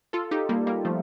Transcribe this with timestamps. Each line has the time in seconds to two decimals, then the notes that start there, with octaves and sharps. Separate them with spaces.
0.13 F4 A4
0.31 D#4 G4
0.49 G3 A#3
0.67 G3 A#3
0.85 F3 A3